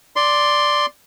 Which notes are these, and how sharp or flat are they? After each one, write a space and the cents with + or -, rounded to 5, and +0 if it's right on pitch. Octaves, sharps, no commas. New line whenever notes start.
D5 +0 C6 +0